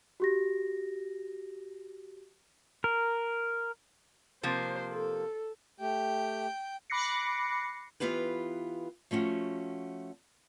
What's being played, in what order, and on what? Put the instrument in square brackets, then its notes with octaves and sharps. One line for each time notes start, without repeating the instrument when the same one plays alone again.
[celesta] F#4 G4 A#6
[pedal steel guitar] A#4
[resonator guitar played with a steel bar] C3 F3 A#3 [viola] C5
[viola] A4
[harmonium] A3 G4 [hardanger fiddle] G5
[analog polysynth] B5 D6 F#6 A#6 C7 C#7
[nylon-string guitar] E3 A#3 B3 F4 G4 B4
F3 A3 C#4 F#4